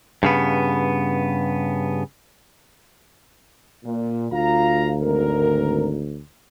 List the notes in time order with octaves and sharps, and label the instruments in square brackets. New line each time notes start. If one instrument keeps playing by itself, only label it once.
[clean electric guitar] G2 C#3 B3
[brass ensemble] A#2
[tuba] D2 [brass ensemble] F4 F5 A#5
[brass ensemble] G#1 A#4